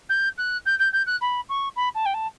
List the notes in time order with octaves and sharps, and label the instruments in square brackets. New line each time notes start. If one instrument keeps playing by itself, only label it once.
[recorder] G6
F#6
G6
G6
G6
F#6
B5
C#6
B5
A5
G5
A5